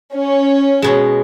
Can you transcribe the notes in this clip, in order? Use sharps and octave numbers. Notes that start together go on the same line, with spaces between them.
C#4
B2 G#3